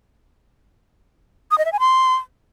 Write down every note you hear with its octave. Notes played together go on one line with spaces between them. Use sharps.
D#6
D#5
E5
G#5
C6